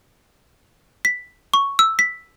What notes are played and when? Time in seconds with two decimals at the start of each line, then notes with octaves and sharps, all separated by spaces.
1.05 B6
1.54 C#6
1.79 E6
1.99 B6